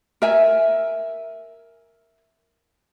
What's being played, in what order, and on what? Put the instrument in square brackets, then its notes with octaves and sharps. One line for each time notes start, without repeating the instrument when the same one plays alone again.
[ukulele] A#4 E5 G#5